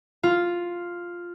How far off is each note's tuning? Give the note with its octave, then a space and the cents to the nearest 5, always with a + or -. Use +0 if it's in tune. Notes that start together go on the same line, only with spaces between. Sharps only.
F4 +0